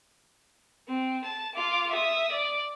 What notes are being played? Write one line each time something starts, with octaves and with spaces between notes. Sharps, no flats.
C4
A5 E7
F4 D6
E5 D#6
D5